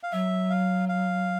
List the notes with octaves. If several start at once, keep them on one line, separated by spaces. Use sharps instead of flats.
F5
F#3 E5
F5
F5